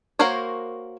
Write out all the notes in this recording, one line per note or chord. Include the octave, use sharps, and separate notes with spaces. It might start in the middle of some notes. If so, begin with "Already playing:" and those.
A#3 F#4 A#4 C5 C#5